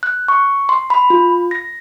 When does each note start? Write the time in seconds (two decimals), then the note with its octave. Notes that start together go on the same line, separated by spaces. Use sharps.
0.03 F#6
0.28 C#6
0.69 C6
0.90 B5
1.10 F4
1.51 A#6